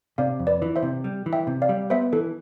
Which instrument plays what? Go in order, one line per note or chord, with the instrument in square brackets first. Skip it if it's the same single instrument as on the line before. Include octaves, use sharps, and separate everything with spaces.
[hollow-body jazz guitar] C3 [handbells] D5 F5
[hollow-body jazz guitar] F2
[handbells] B4 D5
[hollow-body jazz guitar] E3
[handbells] C5 E5
[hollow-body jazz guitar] C3
G3
E3
[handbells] E5 G5
[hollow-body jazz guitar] C3
[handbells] D5 F5
[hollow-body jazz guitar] G3
[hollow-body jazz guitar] B3 [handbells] C5 E5
[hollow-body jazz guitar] E3 [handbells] A4